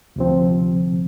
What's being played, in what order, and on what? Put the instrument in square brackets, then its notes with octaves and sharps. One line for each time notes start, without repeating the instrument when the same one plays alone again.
[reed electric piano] D2 C3 F3 C4